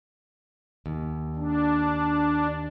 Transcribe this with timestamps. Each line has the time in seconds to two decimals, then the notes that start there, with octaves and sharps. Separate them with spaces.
0.86 D#2
1.36 D4